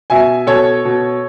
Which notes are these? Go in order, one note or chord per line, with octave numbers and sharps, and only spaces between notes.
B2 E5 G#5
B2 A4 C#5
B2